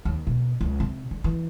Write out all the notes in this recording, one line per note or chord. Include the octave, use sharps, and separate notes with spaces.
D#2
B2
C#2
C3
D3
E3